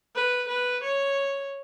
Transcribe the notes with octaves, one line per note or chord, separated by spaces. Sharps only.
B4
B4
C#5